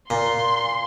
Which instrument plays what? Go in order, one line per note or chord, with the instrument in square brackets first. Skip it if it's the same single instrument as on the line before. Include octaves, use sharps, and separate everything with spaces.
[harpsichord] A#2 [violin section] C6